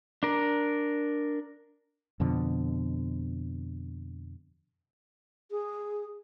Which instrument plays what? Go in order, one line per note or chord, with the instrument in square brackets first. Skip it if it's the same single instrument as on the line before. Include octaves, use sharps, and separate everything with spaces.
[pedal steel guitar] D4 A#4
[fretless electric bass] F2 B2 D3
[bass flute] G#4